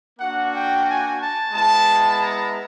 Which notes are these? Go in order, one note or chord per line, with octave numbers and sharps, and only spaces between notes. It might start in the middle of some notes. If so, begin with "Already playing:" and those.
A#3 D4 F#4 F#5
G5
G#5
A5
G#3 B3 E4 A5
A#5